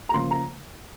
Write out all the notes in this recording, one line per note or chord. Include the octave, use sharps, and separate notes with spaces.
A#5
C#3 F3 A#3 C6
A#5